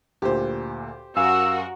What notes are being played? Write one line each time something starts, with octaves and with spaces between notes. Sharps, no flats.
D2 A#2 G4 C5
F#2 F#4 A#4 F5 G#5 E6